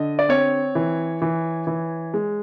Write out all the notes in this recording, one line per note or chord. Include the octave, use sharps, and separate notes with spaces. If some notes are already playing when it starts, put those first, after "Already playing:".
Already playing: D3 D#5
D5
C4 C#5
E3
E3
E3
G#3